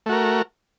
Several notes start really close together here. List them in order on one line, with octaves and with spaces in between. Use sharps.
A3 F#4 A#4